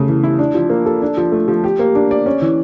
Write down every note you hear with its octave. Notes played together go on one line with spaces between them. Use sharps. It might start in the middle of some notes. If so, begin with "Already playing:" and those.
Already playing: C#3 A3
E3
E4
D4
F3
A#3
A4
D4
F3
A3
F3
G4
A#3
D4
D5
C#4
E3